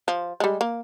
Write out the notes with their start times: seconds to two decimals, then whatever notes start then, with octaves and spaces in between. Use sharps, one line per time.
0.08 F3
0.40 G3 G#3
0.61 A#3